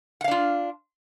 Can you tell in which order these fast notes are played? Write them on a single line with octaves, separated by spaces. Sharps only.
F#5 F5 D4 F4